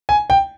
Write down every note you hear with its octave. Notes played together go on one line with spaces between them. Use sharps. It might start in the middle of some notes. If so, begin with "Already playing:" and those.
G#5
G5